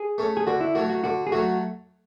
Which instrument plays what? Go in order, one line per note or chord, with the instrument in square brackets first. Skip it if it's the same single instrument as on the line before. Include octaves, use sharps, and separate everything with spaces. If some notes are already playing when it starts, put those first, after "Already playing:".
Already playing: [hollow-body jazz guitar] G#4
[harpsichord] A3 C#4
[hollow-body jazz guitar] G#4
[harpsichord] D3 [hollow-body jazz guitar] F#4
[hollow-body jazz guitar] E4
[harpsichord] F#3 A3 [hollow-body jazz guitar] F#4
[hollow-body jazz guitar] F#4
[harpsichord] D3 [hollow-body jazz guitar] F#4
[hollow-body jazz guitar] G#4
[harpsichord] F#3 A3 [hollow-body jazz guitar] F#4